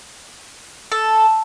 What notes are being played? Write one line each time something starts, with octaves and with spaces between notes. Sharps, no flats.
A4